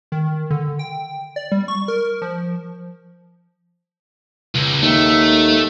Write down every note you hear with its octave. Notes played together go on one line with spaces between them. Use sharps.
D#3
D3
G5
D5
G3
C#6
A#4
F3
C#2
D#2 A3